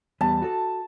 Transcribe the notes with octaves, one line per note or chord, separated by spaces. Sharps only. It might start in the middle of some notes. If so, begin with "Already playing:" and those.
E2 G3 B3 A5
F#4 A4